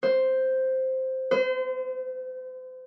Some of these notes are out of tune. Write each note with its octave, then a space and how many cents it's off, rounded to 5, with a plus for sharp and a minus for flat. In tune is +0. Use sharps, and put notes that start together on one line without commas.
C5 +0
C5 -35